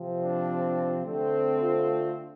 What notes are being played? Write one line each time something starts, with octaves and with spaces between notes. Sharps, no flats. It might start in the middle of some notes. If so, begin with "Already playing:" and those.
Already playing: C3 F3 C4
D4
D3 A3 C4
F4